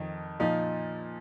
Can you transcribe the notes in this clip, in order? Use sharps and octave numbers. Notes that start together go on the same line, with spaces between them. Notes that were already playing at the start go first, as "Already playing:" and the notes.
Already playing: F2 D#3
A#2 F3 D#4